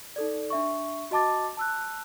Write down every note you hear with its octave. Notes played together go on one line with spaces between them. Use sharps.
D#4 A4 D5
D4 E5 C#6
F#4 D#5 A5 D6 A6
A5 E6 F#6